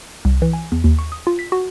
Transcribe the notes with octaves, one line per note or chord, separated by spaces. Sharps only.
C2
E3
G#5
E2
D#2
C#6
D#6
F4
B6
F#4